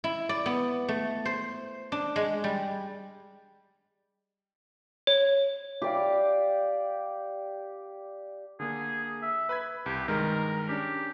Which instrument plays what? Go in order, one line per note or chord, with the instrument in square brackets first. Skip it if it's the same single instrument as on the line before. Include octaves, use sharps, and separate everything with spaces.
[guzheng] E4
D5
B3
A3
C5
D4
G#3
G3
[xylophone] C#5
[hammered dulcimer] G4 D5 F5
[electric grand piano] D3 A#3 [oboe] G#4
[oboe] E5
[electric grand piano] B4 B5 G#6
[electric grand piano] C2 [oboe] G4
[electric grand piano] G2 D#3 G#3 [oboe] A#4
[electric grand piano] C#4 D4 [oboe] G4